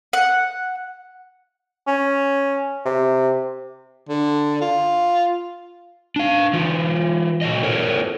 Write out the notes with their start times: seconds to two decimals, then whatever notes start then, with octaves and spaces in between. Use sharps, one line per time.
0.13 F#5
1.87 C#4
2.85 C3
4.09 D3
4.61 F4
6.16 D4 F5
6.53 E3 F4
7.42 A#2 F#3 D#5
7.63 E4 A4 A#4 C5 C#5